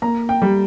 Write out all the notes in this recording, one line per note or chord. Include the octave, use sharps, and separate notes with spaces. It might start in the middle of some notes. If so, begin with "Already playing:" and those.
A#3 A#5
G5
G3